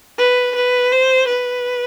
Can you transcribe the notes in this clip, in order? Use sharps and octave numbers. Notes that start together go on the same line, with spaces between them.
B4
B4
C5
B4